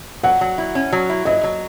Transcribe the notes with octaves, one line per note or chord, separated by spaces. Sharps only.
F#3 F#5
F#3
E4
C#4
F#3
E4
F#3 D#5
F#3